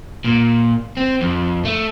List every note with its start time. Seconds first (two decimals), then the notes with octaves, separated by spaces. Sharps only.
0.25 A#2
0.97 C4
1.21 F2
1.65 A3